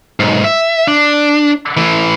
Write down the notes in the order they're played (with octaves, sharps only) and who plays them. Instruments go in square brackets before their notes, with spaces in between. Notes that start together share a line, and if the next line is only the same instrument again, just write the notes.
[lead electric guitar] B1 G#2
E5
D4
E3 A3